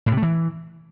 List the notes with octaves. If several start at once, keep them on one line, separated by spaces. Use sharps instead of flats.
A2
C3
A3
E3